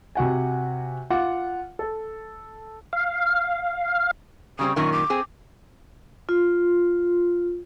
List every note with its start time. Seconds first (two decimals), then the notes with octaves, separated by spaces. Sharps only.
0.15 C3 F#4 F#5 G#5
1.10 F4 F#5 D6
1.79 A4
2.93 F5
4.59 C#3 G3 C4 D#6
4.76 F#2 A#2 D#3 C#6
4.92 D6
5.10 C4 G#4
6.29 F4